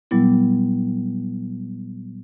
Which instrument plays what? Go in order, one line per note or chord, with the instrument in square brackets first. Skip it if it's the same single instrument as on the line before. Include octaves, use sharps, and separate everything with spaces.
[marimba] A#2 F#3 G3 B3 E4